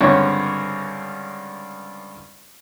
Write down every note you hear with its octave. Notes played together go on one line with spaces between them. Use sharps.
C#2 G2 D3 C4 C#5